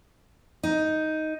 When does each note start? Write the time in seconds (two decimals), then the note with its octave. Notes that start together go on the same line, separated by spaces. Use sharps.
0.63 D#4